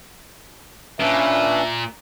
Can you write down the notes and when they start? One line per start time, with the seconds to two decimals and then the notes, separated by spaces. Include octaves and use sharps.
1.00 A#2 C#4 D4 B4 E5